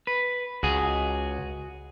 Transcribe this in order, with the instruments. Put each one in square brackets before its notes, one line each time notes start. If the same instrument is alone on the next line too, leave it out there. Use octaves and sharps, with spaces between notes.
[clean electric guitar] B4
[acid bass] C#2 [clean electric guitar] F#4 G#4